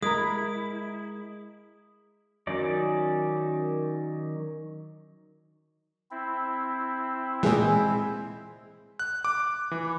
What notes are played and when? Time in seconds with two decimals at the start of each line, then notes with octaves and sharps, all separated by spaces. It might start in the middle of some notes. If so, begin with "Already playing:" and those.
0.03 G#3 E4 A#4 A#5 D#6
2.47 D#3 F#3 C#4 D#4 D5
6.11 C4 E4
7.43 A#2 E3 G#3 G#4
8.99 F#6
9.25 D6
9.71 E3